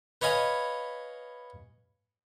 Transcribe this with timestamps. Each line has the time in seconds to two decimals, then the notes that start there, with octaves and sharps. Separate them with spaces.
0.22 B4 C#5 D#5 F5 G#5 B5